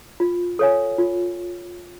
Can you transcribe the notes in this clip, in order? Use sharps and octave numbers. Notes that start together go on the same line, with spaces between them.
F4
A4 C#5 F5 G#5
F4